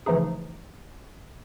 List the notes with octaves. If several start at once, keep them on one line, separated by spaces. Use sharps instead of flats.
C#3 E3 F3 A3 D#4 G#4